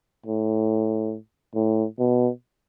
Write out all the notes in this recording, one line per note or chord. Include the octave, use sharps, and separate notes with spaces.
A2
A2
B2